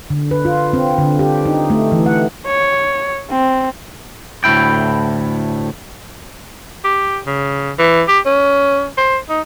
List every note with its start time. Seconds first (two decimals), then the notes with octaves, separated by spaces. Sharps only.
0.10 D3
0.31 B4
0.45 F4
0.73 C4
0.98 D3
1.19 G4
1.46 D#4
1.70 A3
1.92 E3
2.06 F#5
2.46 C#5
3.30 C4
4.44 D2 A2 G#3 E4 G5
6.84 G4
7.26 C#3
7.79 E3
8.08 G4
8.26 C#4
8.97 C5
9.29 D#4